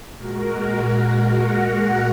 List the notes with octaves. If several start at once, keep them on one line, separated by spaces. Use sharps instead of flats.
A#2 G#3 F#4 A#4
F#5 A#5